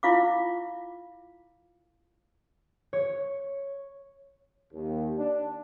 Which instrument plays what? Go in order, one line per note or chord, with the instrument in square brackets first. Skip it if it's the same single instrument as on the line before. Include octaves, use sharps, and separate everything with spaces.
[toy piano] E4 F4 F5 D6
[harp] C#5
[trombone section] D#2
D4